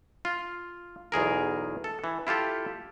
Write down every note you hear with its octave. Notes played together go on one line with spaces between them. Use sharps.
F4
B1 E2 G#4 A#4
A4
E3
E4 F4 G4 A4